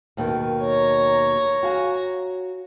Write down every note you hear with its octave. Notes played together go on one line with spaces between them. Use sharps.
D#2 B2 D#3
C#5 A#5
F#4 F5 G#5